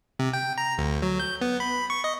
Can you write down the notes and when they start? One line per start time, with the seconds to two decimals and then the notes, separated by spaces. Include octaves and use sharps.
0.19 C3
0.33 G5
0.58 A#5
0.78 D2
1.02 F#3
1.20 G6
1.41 B3
1.60 B5
1.90 C#6
2.04 D#5